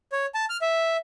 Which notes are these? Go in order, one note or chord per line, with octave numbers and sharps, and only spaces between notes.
C#5
A5
F6
E5